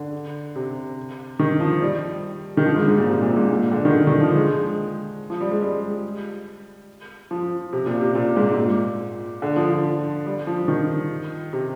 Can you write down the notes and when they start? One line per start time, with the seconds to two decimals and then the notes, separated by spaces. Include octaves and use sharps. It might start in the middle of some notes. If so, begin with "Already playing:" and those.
Already playing: D3
0.55 C3
1.39 D#3
1.60 F3
1.82 G3
2.57 D#3
2.65 F3
2.76 G#2
2.88 G#2
2.98 A#2
3.08 C3
3.22 A#2
3.36 G#2
3.51 A#2
3.72 D3
3.85 D#3
3.93 D3
4.07 D#3
4.20 F3
4.35 G#3
5.30 F3
5.41 G3
5.51 G#3
5.62 G3
7.31 F3
7.73 C3
7.86 A#2
8.01 C3
8.15 A#2
8.36 G#2
8.57 A#2
9.42 D3
9.56 F3
9.70 F3
10.26 G3
10.47 F3
10.68 D#3
11.53 C3